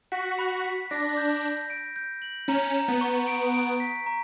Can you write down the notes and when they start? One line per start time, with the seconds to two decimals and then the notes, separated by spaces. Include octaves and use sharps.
0.12 F#4 B6
0.39 B5
0.64 B6
0.91 D4 A#6
1.17 G6
1.43 G6
1.70 D7
1.96 G6
2.22 F#7
2.48 C#4 A#5
2.75 A#5
2.88 B3
3.01 C#6
3.27 D7
3.54 D7
3.80 B6
4.06 A#5